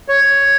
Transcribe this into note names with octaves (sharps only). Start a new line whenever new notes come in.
C#5